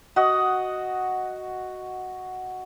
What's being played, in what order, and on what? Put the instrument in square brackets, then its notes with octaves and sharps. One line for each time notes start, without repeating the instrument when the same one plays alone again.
[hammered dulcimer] F#4 D#5 F#5